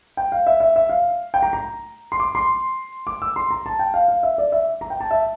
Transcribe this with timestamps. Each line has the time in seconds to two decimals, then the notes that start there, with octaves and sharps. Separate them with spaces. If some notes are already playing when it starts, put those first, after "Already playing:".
0.17 G5
0.32 F5
0.47 E5
0.60 E5
0.76 E5
0.89 F5
1.34 G5
1.43 A#5
1.53 A#5
2.12 C6
2.20 D6
2.35 C6
3.07 D6
3.22 E6
3.36 C6
3.51 A#5
3.66 A5
3.79 G5
3.94 F5
4.08 F5
4.23 E5
4.38 D5
4.52 E5
4.81 A#5
4.90 G5
5.00 A5
5.11 E5